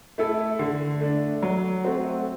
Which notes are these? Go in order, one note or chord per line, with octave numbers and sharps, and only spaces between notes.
A3 E4 A4
D3
A3 D4
F#3
A3 C4 F#4